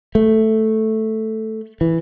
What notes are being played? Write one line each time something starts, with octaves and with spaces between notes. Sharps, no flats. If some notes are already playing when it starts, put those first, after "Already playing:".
A3
E3